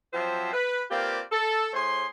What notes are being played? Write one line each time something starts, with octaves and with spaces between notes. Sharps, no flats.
F3 F#3 C4 C5 E5 A5
B4
A#3 C4 F4 G4 B4 D5
A4
A2 G#4 C5 C#5 C6